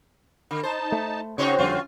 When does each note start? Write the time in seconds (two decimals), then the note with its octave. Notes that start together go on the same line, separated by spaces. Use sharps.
0.51 D3
0.63 D#4 C5 A5
0.92 A3
1.38 C#3 C4 C#4 D#4 F#4 C5 C#5
1.58 F2 D3 G3 C#4 F4